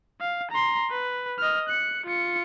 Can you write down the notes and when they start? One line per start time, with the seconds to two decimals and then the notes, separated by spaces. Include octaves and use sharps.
0.21 F5
0.51 A#5 C6
0.91 B4
1.39 D#5 F6
1.69 F#6 C#7
2.06 F4 C#7